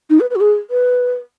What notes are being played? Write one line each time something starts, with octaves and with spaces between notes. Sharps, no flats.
D#4
B4
B4
F#4
G#4
B4